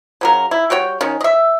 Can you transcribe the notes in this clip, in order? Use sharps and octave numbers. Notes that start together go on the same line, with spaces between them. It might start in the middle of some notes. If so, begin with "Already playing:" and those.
C#3 F#3 A#4
E4
G3 F#4 C#5 G5
D#3 C#4
D#5 E5